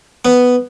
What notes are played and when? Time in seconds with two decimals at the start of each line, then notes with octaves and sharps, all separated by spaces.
0.25 B3